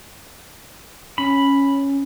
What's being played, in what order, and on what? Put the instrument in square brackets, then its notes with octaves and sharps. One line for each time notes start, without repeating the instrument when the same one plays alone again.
[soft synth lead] C#4 [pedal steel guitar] B5